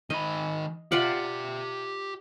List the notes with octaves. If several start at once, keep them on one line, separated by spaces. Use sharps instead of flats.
D#3 D#5 B5
F4 G4 D5 E5 F#5